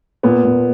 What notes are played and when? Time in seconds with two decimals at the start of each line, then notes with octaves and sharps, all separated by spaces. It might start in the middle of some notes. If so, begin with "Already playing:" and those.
0.23 A#2 B3
0.44 A#2